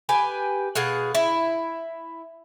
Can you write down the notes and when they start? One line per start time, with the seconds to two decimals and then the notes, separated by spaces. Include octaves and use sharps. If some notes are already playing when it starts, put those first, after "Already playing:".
0.09 G4 B4 G#5
0.75 B2 G#4 F5 F#5
1.15 E4